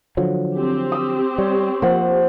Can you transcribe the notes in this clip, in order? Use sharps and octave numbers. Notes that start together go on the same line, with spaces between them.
D3 F3 F#3
C4 G4
D#6 E6
G3 C#5
F3 A#3 C5 F#5